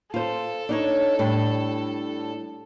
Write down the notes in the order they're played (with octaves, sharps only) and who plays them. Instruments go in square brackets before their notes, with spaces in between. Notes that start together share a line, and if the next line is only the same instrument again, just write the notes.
[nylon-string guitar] F4 C5 [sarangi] A4
[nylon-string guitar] D4 D#4 C#5
A2 G3 D4